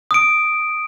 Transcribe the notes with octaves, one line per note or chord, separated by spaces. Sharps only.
D#6 D7